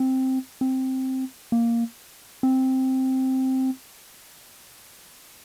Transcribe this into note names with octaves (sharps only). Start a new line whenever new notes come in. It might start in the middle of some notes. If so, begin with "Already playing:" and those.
Already playing: C4
C4
A#3
C4